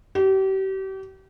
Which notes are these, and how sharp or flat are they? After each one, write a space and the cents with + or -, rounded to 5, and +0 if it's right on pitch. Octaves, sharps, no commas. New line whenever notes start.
G4 -35